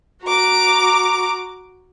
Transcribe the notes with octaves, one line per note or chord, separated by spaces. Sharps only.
F#4 A#5 D6